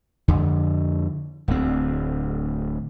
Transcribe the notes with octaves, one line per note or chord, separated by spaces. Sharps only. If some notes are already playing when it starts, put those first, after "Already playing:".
F2 D3
D1 D2 C4